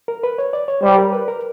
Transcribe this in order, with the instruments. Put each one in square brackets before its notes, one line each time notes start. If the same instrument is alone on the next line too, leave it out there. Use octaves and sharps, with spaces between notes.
[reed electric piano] A#4
B4
C#5
D5
C#5
[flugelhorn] G3 [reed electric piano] C5
[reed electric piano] A#4
B4
A#4